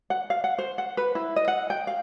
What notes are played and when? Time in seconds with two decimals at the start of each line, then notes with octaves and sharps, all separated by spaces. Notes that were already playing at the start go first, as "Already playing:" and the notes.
0.10 F#5
0.30 F5
0.44 F#5
0.58 C5
0.78 F#5
0.97 B4
1.15 E4
1.36 D#5
1.48 F#5
1.70 G5
1.87 F5